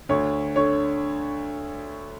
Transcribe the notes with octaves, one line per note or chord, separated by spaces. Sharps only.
D2 C#5
D3 C#5